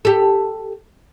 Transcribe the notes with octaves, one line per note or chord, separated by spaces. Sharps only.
G4 A4